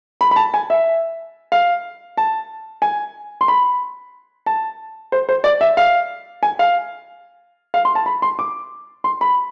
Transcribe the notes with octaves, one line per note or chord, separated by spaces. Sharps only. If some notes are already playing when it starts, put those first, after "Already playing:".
B5
B5
A5
G#5
E5
F5
A5
G#5
C6
B5
A5
C5
C5
D5
E5
F5
G#5
F5
F5
C6
A5
B5
C6
D6
C6
B5